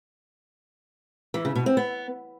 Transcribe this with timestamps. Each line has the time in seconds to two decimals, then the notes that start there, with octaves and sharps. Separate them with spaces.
1.34 E3
1.45 C#3
1.55 B2
1.66 C4
1.77 B3